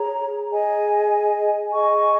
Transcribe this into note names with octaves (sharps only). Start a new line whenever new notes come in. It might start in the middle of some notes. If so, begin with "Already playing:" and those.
Already playing: G#4 C#5 A#5
G#4 D#5 G#5
G#4 D#5 G#5 C#6